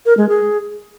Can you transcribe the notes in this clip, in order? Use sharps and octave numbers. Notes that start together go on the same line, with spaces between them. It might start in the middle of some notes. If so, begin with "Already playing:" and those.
A#4
G#3
G#4